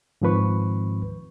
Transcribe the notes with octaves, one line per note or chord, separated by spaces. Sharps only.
G#2 D#3 F3 C4 B4 C#6